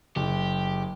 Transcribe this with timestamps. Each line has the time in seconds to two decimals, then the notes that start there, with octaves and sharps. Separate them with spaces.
0.16 F#1 G4